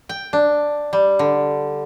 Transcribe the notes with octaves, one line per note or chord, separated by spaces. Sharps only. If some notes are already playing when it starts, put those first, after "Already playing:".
G5
D4
G3
D3